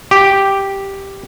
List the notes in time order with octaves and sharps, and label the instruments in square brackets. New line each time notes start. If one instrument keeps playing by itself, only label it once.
[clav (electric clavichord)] G4